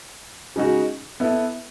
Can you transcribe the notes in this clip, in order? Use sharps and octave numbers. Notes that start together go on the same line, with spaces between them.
C#3 G#3 D#4 F#4
B3 E4 A4 E5